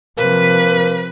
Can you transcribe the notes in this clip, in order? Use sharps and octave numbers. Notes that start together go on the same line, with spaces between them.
C3 F3 A#3 B4